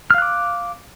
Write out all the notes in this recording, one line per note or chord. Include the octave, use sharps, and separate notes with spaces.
F5 D6 F6 F#6